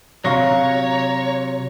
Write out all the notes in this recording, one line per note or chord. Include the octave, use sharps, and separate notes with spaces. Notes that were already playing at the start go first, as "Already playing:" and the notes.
C3 F#3 C#5 F5 A#5 C#6 A#6